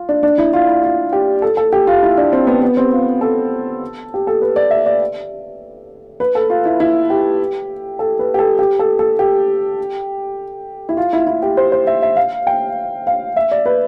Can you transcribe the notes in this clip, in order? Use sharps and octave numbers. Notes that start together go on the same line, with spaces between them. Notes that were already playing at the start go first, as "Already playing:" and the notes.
Already playing: F4
D4
D4
E4
F4
E4
F4
G4
A4
A4
G4
F4
E4
D4
C4
B3
B3
C4
F4
A4
G4
A4
B4
D5
E5
D5
B4
A4
F4
E4
E4
G4
A4
B4
G4
A4
G4
A4
A4
G4
E4
F4
E4
E4
G4
C5
C5
E5
E5
F5
G5
F5
E5
D5
B4